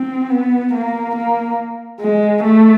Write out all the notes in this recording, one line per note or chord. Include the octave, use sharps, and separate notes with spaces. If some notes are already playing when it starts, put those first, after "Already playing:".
Already playing: C4
B3
A#3
A#3
G#3
A3